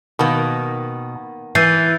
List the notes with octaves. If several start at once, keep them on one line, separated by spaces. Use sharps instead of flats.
B2 D#3 A#3 B3
E3 G#5 G6 A6 C7